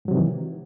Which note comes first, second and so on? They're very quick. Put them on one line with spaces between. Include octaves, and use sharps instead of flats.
G#2 F#3 C3 D#3 E3